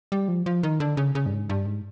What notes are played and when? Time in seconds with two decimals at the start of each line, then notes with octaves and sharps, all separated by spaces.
0.12 G3
0.28 F3
0.46 F3
0.63 D#3
0.80 D3
0.97 C#3
1.15 C#3
1.26 G2
1.32 G#2
1.49 G2
1.66 G#2